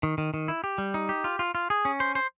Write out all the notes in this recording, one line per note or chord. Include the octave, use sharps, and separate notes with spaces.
D#3
D#3
D#3
E4
G4
G3
D#4
G4
F4
F4
F4
G#4
C#4
C5
C5